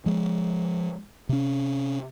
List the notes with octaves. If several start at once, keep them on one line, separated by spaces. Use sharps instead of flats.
F3 G#3
C3 C#4